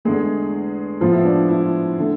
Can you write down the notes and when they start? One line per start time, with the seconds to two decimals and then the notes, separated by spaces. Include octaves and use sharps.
0.05 E2 D3 G#3 A3 G#4
1.01 A2 F3 G#3 B3 F4
1.13 E4
1.25 D4
1.49 E4
1.98 D3 A3